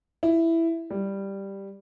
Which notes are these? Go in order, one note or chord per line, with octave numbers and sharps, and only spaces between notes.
E4
G3